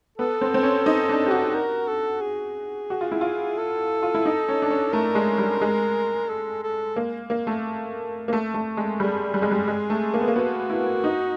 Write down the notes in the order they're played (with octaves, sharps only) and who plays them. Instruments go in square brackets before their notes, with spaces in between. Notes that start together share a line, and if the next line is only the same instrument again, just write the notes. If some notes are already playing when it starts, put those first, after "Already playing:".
[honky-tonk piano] B3 [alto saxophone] A4
[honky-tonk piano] C4
C4
C#4
D#4
D4
G4
F#4
[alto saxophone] A#4
A4
G#4
[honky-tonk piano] F#4
F4
E4
F4
[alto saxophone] A4
[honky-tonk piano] F4
E4
D#4
C#4
D4
C#4
[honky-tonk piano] A3 [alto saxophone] A#4
[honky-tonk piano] G#3
G3
G#3
[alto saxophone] A4
A4
[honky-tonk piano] A#3
A#3
A3
A#3
A3
A3
G#3
[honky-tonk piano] G3 [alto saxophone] G#4
[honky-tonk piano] G3
G#3
G3
G#3
A3
A#3
B3
A#3
[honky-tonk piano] B3 [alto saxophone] F#4
[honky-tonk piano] E4
D#4